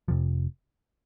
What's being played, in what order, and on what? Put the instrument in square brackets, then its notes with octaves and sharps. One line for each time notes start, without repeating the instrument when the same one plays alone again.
[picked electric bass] F1 F2 C3 F3